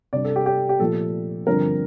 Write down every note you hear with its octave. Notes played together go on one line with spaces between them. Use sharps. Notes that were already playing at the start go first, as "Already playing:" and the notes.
C3 G3 D4 D5
A4
G4
G4
G4
A#2 F3 A3 A4
G2 D3 F3 C4 A#4